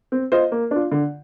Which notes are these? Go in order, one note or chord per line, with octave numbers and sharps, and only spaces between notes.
C4
F4 C5 D#5
A#3
D4 F4
D3